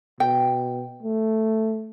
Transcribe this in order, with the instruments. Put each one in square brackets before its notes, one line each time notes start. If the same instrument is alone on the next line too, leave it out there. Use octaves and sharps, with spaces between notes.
[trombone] B2 [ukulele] G5
[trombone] A3